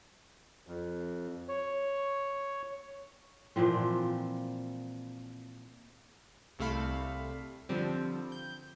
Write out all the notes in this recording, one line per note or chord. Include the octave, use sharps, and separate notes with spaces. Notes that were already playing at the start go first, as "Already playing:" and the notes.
F2
C#5
A#2 E3 F3 C4
C2 C3 A3 A4 F5 B5
D3 F3 G3 C4
G6